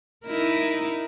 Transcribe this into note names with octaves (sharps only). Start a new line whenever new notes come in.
D#4 E4 A#4